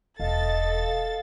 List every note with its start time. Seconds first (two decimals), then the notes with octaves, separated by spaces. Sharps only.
0.20 E1 A4 D#5 F5 A6